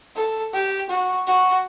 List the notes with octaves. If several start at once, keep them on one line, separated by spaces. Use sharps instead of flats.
A4
G4
F#4
F#4